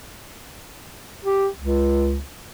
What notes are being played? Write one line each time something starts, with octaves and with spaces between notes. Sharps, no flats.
G4
C#2